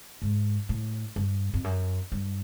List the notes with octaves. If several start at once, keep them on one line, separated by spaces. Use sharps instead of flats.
G#2
A2
G2
F2
F#2
G2